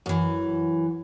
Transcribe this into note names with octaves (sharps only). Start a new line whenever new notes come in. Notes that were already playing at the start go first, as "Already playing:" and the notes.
F#2 E3